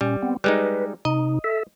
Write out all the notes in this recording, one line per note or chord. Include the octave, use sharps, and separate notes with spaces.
A#2 G3 C#4
B3 C4
G3 G#3 D#4 B4
C3 D#4 D#5
A4 E5